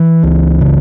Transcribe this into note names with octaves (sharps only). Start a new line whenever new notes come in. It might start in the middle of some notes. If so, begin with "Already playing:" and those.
Already playing: E3
C#2
C#3